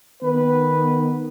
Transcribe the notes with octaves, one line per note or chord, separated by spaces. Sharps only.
D#3 B3 B4